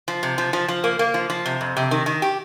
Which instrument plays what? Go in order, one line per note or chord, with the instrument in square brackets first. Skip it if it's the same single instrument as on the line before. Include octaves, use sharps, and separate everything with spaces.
[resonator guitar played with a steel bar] F3
C3
F3
F3
F3
A#3
A#3
F3
F3
C3
F2
C3
D#3
D#3
G4